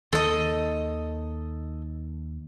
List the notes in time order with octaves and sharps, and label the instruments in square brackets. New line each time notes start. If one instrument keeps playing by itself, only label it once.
[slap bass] D#2 D#3 [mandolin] A4 D#5